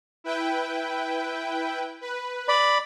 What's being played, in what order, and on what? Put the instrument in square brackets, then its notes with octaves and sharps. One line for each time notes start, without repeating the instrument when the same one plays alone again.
[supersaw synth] E4 B4 G5
B4
[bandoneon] D5 B5